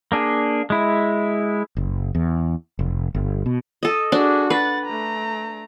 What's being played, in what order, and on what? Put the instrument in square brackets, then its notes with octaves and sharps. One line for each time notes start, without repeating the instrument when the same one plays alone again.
[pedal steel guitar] A#3 D4 G#4
G#3 E4
[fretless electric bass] F#1
E2
F1
G1
B2
[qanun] A4 D#5
[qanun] D4 [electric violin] F#4 G#4
[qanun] B4 [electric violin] F#5 A6
[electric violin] A3 A#5